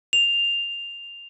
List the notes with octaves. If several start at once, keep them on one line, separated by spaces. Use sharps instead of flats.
F7